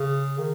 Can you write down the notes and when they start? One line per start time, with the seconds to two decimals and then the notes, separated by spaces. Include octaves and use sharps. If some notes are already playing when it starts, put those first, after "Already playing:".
Already playing: C#3
0.38 D#3